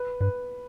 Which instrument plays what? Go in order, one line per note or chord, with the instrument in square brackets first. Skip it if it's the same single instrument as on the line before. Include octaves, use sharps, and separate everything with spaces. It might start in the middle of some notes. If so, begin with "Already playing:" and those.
Already playing: [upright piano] B4
[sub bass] G2 [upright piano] B4